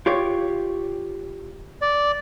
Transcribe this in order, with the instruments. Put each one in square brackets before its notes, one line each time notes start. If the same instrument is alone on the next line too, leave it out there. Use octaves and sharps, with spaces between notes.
[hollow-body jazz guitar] F4 G4 C#5
[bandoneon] D5